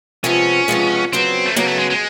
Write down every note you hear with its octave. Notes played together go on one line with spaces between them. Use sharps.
C3 F3 G#3 B3 C#4
C3 F3 G#3 B3
C#3 F#3 B3 C4
A3
C#3 F#3 A#3 B3
A3
G#3
G#3